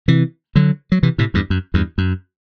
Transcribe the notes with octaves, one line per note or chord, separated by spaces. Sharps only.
C3 E3
D3 F#3
F#3
C3 E3
A2 C3
E2 G2
F#2
E2 G2
F#2